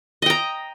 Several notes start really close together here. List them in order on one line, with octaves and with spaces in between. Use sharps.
D#5 G5 A#5